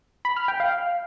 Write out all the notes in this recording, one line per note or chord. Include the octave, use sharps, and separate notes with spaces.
B5
F6
G5
F5